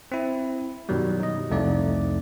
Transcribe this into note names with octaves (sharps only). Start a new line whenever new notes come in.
C4 E4
F#2 B2 D#3 F#3 G3
D#4 D#5
C2 F2 A3 D#4 D5